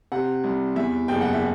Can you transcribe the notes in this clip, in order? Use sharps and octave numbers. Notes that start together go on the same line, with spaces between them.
C3 F#5
C2
E2 E5
F#1 G5
F#5
E5